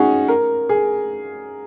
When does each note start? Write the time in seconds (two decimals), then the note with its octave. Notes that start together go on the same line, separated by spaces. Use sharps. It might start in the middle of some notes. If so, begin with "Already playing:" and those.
Already playing: C#4 D#4 F#4 G#4
0.28 A#4
0.69 G#4